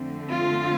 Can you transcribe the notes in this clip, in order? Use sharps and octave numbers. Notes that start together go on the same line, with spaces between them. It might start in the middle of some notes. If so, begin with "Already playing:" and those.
Already playing: F2 D3 A3 C4
F4